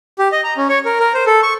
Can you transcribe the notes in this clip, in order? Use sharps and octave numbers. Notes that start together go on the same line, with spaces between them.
G4
D#5
A#5
C#4
C#5
A#4
A#4
C5
A4
C#6